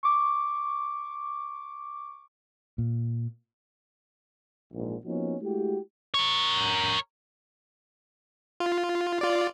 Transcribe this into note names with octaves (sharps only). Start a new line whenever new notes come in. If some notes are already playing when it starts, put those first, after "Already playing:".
C#6 D6
A#2
A#1 G#2
F3 A#3 B3 C#4 D#4 F#4
G#3 A3 E4 F#4 G4
A#4 C#5
F4
F4 D5